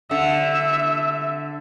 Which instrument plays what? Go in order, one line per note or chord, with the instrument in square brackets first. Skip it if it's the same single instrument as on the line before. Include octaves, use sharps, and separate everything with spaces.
[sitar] D3 [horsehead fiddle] E5